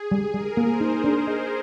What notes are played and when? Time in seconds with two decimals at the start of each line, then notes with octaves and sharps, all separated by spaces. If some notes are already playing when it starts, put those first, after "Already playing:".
Already playing: G#4
0.12 G3
0.34 G3 A#4
0.57 A#3
0.69 C5
0.81 D#4
1.04 D4
1.27 D#5